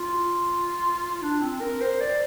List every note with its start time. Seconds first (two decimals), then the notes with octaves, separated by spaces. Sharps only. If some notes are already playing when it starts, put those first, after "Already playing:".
Already playing: F4
1.22 D4
1.42 C4
1.61 A#4
1.81 C5
2.00 D5